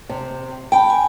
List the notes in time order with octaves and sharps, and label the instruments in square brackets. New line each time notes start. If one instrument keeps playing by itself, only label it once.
[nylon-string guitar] C3
[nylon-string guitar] G5 [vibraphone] A5 B5
[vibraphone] G#5